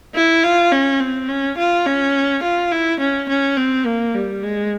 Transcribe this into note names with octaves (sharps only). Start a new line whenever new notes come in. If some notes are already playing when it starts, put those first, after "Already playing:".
E4
F4
C#4
C4
C#4
F4
C#4
F4
E4
C#4
C#4
C4
A#3
G3
G#3